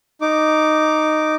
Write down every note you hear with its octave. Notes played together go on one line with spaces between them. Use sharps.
D#4 D6